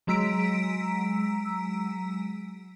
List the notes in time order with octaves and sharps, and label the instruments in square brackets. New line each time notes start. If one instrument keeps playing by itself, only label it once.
[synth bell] F#3 G#3 A#5 E6 B6 D7